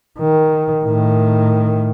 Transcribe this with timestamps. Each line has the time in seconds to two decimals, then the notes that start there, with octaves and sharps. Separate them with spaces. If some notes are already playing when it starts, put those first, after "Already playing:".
0.19 D#3
0.83 A2 D#3